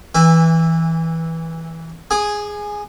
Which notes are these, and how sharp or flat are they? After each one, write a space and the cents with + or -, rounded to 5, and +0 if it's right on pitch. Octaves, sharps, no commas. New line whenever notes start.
E3 -10 E5 +0 G#5 -40
G#4 +0 G#5 +0 D#6 -40